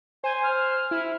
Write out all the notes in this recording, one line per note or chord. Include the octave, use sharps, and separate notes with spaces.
C5 G#5
F6
E4